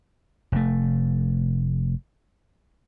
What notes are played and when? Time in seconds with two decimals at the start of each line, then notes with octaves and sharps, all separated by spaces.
0.52 F1 A3